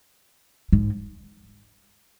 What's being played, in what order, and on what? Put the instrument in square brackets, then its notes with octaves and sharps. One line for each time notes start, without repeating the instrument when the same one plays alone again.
[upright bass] G#2